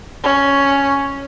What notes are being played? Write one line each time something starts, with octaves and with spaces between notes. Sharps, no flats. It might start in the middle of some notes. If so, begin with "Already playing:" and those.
C#4